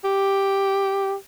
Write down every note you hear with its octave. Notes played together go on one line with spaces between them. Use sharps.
G4